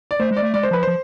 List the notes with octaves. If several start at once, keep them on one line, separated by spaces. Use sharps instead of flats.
D5
A3 C5
G#3
D5
A3
G#3 D5
C5
F3 B4
F3 C5